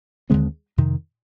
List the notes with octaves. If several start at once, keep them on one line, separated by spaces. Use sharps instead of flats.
D#2 D3 G#3 C4
F2 C3 D#3